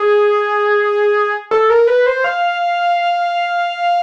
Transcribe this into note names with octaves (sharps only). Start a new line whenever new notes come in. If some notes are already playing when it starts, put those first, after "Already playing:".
Already playing: G#4
A4
A#4
B4
C5
F5